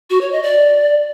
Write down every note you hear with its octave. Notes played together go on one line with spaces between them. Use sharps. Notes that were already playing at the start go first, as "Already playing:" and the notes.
F#4
C#5
D#5
D5